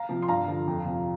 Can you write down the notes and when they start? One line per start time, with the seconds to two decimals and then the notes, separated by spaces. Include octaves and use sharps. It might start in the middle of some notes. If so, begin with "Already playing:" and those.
Already playing: F5 A#5
0.09 C3 F3
0.22 C6
0.28 G2 F5 A#5
0.48 D3 F3
0.67 F2
0.86 C3 F3